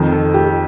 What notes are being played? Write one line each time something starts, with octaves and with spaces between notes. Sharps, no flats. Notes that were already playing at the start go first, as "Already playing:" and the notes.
Already playing: F2 D#3
A4
G4